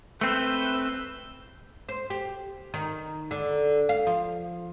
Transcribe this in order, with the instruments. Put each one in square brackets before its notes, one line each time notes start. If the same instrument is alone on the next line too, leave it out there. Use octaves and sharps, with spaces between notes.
[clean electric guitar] A3 C4 [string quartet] B4 E6 G6
[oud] C5
G4
D#3
D3
F5
F3